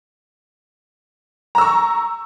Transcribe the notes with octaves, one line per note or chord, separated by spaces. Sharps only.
A#5 C#6 E6